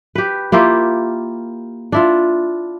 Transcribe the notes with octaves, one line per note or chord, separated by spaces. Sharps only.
G4 B4
A#3 E4 F4 G4
D4 E4 F4